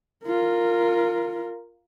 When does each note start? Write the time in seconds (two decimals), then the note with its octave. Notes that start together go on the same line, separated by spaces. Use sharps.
0.25 F4 A#4